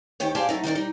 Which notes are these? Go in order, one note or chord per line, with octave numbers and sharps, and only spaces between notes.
D2 D#3 G4 C#5
G4 G#4 C5 D5 F5 A5
F#3 A3 D#4
D#3 D#4 A#4 D5
G3 D#4